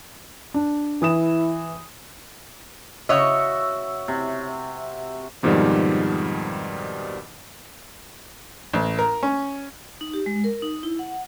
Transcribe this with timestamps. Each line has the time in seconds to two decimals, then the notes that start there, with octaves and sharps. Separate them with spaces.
0.54 D4
1.02 E3 E4 D#6 E7
3.09 C#3 F#4 C#5 D#5 E5
4.08 C3
5.43 F2 G#2 B2 D#3 F3 G3
8.73 A1
8.99 A#4
9.23 C#4
10.01 D#4
10.14 G4
10.26 G#3
10.44 A#4
10.62 D#4
10.83 E4
10.99 F#5